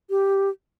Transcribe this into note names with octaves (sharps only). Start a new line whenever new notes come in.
G4